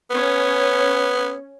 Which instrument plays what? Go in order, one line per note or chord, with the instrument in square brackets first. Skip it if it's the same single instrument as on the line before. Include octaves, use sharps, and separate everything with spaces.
[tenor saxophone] B3 [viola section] C#4